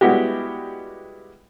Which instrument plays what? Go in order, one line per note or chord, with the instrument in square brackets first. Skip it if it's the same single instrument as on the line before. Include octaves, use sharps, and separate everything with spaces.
[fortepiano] G3 G#3 B3 E4 F#4 G4